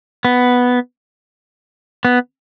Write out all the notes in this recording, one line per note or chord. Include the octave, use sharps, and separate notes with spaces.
B3
B3